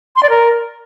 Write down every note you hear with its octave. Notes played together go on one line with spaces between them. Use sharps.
C6
D5
A#4